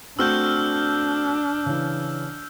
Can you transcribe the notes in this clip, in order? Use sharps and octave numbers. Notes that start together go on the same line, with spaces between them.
A3 C4 D4 F#4 E6 F6 G6
C#3 E3